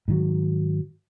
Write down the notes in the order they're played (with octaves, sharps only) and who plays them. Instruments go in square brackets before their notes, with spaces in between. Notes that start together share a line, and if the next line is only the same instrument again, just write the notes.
[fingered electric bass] G#2 D#3 F#3